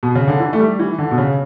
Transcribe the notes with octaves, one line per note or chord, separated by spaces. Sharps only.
B2
C#3
D3
E3
A3
G3
E3
D3
B2
C#3